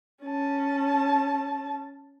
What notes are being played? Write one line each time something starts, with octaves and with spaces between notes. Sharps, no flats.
C#4 A5